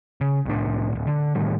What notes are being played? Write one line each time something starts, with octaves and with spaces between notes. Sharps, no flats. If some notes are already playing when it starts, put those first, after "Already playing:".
C#3
C2 A2 D4
D1 A#1
D3
A2 D#3 G3